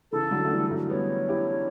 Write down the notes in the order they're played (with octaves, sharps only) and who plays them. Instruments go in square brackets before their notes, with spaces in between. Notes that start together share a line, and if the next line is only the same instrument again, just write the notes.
[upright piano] C#3 E3 [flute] A4
[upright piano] D3 F#3
A3
E3 G3
F#3 A3
[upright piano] G3 B3 [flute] C#5
[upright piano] E4 G4